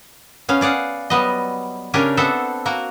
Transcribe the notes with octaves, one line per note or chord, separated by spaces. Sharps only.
B3 C#4 F5
G#4 D5 F5 F#5
F#3 G3 B3 D#5
C#3 C#4 D4 G4 A#4 G#5
B3 C4 A4 C5 E5 F#5
A#3 F#4 A#4